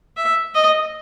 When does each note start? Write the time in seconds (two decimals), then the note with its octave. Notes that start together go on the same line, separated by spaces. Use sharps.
0.17 E5
0.55 D#5